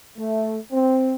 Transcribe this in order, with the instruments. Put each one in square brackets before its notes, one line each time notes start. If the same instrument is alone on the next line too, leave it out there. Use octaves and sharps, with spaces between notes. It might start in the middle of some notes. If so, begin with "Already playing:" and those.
[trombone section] A3
C4